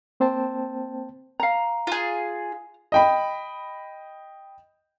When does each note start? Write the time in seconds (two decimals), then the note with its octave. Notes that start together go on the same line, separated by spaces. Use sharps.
0.20 A#3 C4 C5 G5 A5
1.40 F5 A#5
1.87 F4 G#4
2.92 D#5 G5 B5